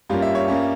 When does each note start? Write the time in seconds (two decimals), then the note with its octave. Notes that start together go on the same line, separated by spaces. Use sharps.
0.10 G2 G3 A#3 C#4 F4
0.22 E5
0.35 C#5
0.48 G3 A#3 C#4